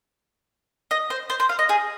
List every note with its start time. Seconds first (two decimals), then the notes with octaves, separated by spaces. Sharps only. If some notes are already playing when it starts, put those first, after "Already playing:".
0.91 D#5
1.10 C5
1.30 C5
1.40 C5
1.49 F5
1.59 D#5
1.69 G#4